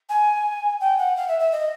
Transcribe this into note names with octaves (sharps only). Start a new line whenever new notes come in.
G#5
G5
F#5
F5
E5
E5
D#5